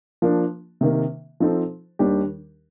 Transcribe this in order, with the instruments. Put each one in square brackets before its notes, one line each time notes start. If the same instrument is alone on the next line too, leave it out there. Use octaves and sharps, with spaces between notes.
[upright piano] F3 A#3 D4
C3 D#3 A#3
F3 C4 D#4 A4 C5
D#2 D#3 G3 D4 G4